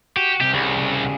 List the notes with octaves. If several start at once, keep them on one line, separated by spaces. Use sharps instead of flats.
F#4 G4
C2 C3 G4
C2 C#3 G3